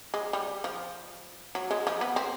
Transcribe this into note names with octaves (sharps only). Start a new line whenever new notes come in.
G#3
G3
F3
F#3
G#3
F3
B3
C4